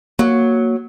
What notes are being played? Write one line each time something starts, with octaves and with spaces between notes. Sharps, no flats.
F#3 A#3